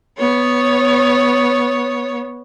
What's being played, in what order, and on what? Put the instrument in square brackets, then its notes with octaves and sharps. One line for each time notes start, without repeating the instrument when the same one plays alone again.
[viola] B3 C#5